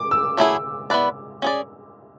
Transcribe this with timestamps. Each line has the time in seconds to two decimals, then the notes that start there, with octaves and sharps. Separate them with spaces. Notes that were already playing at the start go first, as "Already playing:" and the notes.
Already playing: D6
0.11 E6
0.37 F#3 A3 E4 G#4
0.90 B3 E4 B4 D5
1.42 C#4 G#4 D5